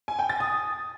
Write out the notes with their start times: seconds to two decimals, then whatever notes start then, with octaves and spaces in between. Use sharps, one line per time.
0.08 G#5
0.19 G5
0.29 A6
0.40 D#6